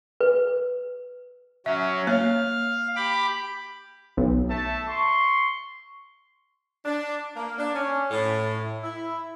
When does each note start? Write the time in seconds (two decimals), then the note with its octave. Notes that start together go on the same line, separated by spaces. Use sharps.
0.21 B4
1.66 F#3 C#4 E5
2.07 A#3 C#5 F5
2.96 G4 B5 D6
4.17 B1
4.50 A3 E5 A5
4.88 C6 C#6
6.85 D4
7.37 A#3
7.58 D4
7.74 C#4
8.11 A2
8.82 E4